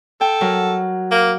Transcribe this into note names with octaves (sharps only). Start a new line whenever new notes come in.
A4 G5
F#3 A#4
A#3